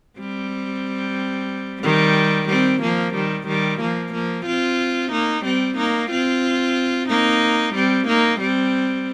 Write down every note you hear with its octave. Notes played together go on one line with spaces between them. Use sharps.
G3 C4
D#3 G3
G3 C4
F3 A#3
D#3 G3
D#3 G3
F3 A#3
F3 A#3
C4 F4
A#3 D#4
G3 C4
A#3 D#4
C4 F4
A#3 D#4
G3 C4
A#3 D#4
G3 C4